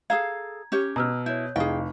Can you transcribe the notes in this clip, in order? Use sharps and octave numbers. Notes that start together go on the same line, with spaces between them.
G#4 A4 F5 A#5 G#6
C#4 G4 C#5
B2 A#5 E6 F6
E4 C#5 G6
F1 E4 G#4 D#5 F5 G5